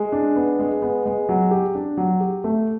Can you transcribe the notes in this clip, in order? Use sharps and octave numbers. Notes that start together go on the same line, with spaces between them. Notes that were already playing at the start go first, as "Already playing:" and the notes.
Already playing: G#3
D4
B3
G#3
B3
G#3
F#3
G4
D4
F#3
G4
A3